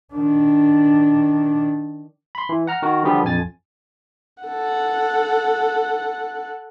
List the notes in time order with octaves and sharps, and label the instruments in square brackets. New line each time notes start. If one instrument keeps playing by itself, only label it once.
[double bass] D#3 D4
[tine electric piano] B5 C6
E3
F#5 A#5 F6
D#3 F#4 A#4
D3 F3 G3 B3 G4 G#4
A#1 F2 G#5 A6
[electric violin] A4 F#5